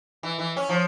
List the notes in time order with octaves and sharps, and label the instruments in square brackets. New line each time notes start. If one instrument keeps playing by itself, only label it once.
[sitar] E3
E3
C#4
F3